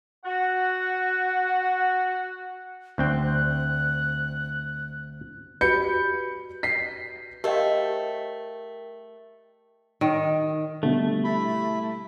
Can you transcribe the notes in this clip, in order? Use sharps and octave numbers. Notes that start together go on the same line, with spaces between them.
F#4 F#5
D2 C4 G5 F#6
F#4 G4 B4 B5 G6 C#7
B6 C7
A3 G4 A#4 C5 D#5 F5 G5
D#3
B2 D3 G3 A3
E4 B5